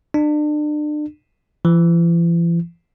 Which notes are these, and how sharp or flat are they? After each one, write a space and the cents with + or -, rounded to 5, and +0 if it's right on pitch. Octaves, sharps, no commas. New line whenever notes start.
D4 +35
E3 +45